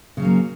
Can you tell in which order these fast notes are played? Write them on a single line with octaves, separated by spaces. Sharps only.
C#3 C#4 F#3 A#3